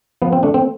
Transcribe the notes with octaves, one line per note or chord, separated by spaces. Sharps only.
F3 B3
C4
A3 D4
C4